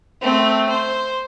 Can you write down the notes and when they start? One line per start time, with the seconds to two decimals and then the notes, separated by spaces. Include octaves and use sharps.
0.22 A3 C4
0.69 C5